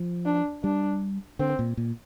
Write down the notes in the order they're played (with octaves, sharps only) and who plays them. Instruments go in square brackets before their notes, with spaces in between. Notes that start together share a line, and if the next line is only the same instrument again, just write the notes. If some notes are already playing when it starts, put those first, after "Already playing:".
Already playing: [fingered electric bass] F3
[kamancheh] D4
[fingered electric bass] G3 [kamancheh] D4
[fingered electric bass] D3 [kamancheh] C4
[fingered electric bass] A#2
A#2